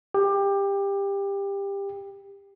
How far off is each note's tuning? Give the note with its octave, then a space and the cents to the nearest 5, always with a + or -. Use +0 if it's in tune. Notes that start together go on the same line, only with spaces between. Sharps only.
G4 +20